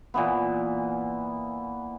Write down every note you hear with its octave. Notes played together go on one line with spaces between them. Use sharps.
A#2 E3 B3